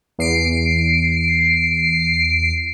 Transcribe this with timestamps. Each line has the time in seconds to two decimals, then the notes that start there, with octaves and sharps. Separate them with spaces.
0.18 E2 C7 D7